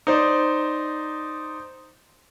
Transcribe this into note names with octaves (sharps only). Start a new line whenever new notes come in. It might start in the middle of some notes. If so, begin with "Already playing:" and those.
D#4 C5 D5